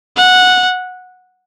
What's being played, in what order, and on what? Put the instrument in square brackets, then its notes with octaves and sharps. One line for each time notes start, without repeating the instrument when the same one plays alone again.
[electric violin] F#5